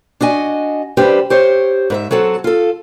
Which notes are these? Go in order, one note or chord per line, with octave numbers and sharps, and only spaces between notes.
D4 F#4 D#5 G#5
G3 D4 G4 B4 C5
G4 C5 C#5
G#2 B4 E5
F#3 C4 A4 F#5
F4 A4